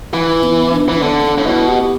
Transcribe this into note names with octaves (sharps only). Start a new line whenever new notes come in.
E3 E4
B3
D4
E3 D4
D3 B3
B3
D4
A2
B2 E4
G4